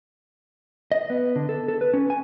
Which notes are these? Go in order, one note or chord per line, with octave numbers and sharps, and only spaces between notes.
D#5
B3
D3
A4
A4
B4
C#4
G#5